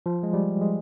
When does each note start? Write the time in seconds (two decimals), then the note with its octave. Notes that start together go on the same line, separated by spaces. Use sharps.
0.06 F3
0.23 G#3
0.33 G3
0.61 G#3